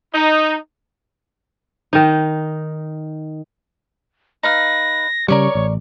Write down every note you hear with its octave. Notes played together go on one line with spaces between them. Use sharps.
D#4
D#3 D#4
D#4 B4 F5 A#6
C#3 G3 A#4 C#5 D5 C#6
A1